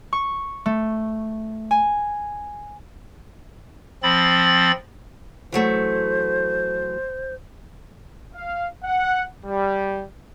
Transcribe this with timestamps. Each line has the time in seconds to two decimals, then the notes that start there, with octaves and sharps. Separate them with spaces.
0.13 C#6
0.66 A3
1.71 G#5
4.03 F3 C4 B5 A6
5.52 E3 F#3 A3 C5
8.35 F5
8.84 F#5
9.45 G3